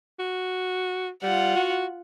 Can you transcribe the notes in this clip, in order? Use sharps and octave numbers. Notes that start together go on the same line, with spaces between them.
F#4
G3 F4 F#5
F#4